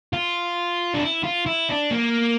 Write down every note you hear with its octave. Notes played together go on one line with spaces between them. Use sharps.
F4
D4
E4
F4
E4
D4
A#3